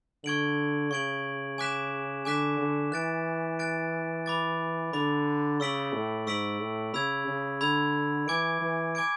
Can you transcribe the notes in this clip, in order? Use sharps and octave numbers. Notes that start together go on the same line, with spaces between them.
D3 C#6 G#6 D7 F#7
C#3 C#6 G#6 D7 F#7
G#5 D6 F#6 B6 E7
D3 G#5 D6 F#6 B6 E7
D3
E3 F#6 A6 D7
F#6 A6 D7
B5 D6 A6
D3 B5 D6 A6
C#3 C#6 E6 B6 D7 F#7
A2
G#2 C#6 E6 B6 D7 F#7
A2
C#3 B5 E6 G#6
C#3
D3 B5 E6 G#6
E3 G#5 D6 G#6 D7
E3
G#5 D6 G#6 D7